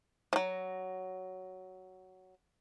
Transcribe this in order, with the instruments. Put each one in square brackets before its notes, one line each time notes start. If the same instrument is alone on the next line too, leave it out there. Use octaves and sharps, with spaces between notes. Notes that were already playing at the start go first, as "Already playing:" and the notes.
[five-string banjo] F3 F#3